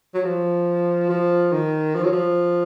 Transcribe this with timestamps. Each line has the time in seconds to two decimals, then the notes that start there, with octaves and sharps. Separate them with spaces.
0.14 F#3
0.24 F3
1.10 F3
1.52 D#3
1.95 F3
2.04 F#3
2.12 F3